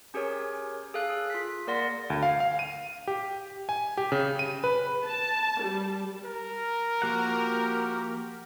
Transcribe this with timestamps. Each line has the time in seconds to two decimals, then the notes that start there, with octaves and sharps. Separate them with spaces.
0.14 C#4 G4 G#4 A#4 C#5
0.94 G#4 A4 F5 F#6
1.10 G#4
1.30 F4 B6
1.67 A#3 A#4 D5 F#5 C6 A#6
2.10 D2
2.23 F5
2.40 F5
2.59 D#7
3.08 G4
3.69 G#5
3.97 G4
4.12 C#3
4.39 D#7
4.64 B4
5.06 A5
5.63 G3
6.25 A#4
7.02 F3 A#3 F#4 G4 F#5